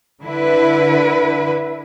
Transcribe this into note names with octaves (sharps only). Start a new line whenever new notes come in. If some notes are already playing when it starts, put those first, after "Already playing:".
D3 E4 B4